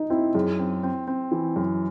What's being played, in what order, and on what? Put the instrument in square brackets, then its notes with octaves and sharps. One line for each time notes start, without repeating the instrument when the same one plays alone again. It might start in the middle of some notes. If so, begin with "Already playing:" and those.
Already playing: [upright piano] D#4
[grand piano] C4 [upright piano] E4
[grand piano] F#2 [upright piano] G#4
[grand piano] C4
C4
C4
E3
F#2